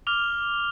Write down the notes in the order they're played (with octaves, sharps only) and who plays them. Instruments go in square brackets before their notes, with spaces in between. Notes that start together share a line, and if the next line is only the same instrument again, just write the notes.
[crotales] D6 F6 F7 G7